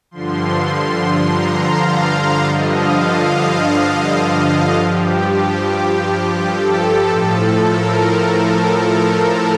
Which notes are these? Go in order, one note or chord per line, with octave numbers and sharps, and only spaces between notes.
G2 D3 F3 C6
A#5
F5
F5
F5
G2 D3 F3 D#5
F5
F5
F5
G2 F3 G4
G4
A4
A2 F3
A#4
A4